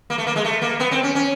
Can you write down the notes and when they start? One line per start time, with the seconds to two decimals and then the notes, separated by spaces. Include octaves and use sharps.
0.10 A#3
0.18 A3
0.27 A#3
0.36 G#3
0.45 A3
0.62 A#3
0.80 B3
0.91 C4
1.03 C#4
1.15 C#4